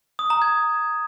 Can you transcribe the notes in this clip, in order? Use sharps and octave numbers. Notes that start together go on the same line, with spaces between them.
D#6
A#5
G#6